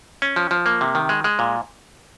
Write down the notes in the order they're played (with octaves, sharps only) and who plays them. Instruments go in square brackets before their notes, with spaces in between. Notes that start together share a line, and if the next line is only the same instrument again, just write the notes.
[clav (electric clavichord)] C#4
F3
F3
A#3
C3
D#3
G#3
G#3
A#2